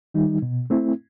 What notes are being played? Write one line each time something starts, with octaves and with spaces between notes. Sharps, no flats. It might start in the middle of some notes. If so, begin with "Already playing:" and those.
D#3 G3 D#4
B2
A3 C4 E4